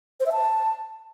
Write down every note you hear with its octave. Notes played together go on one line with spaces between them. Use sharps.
C5
E5
A5